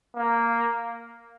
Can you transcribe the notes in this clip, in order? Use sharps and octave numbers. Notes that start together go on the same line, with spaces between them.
A#3